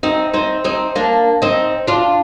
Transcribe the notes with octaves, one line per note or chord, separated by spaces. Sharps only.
C4 D#4
C4 D#4
C4 D#4
A#3 D4
C4 D#4
D4 F4